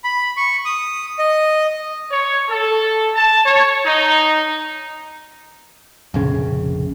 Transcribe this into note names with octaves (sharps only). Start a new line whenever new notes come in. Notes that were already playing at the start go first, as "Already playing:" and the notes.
B5
C#6
D#6
D#5
C#5
A4
A5
C#5
D#4
F1 A#1 C#3